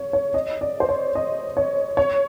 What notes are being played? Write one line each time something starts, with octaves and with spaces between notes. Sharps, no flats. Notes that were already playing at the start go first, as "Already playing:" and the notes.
Already playing: C#5
C#5
D#5
D5
C5
C#5
D#5
C#5
C#5